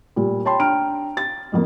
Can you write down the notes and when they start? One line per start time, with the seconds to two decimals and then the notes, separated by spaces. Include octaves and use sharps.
0.16 A#2 G3
0.45 C#5 G5 A5 B5 C6
0.59 D4 G5 A#5 F6 D7
1.17 A6
1.52 F#1 F2 A#3